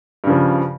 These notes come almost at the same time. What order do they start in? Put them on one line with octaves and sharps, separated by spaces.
G2 C#3 F3